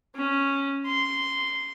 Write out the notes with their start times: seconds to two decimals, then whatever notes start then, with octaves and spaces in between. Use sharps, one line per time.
0.16 C#4
0.86 C6